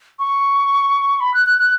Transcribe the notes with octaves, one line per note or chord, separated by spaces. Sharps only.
C#6
B5
F#6
F#6
F#6